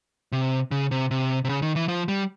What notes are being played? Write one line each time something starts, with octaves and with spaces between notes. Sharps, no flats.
C3
C#3
C3
C3
C3
C#3
D#3
E3
F3
G3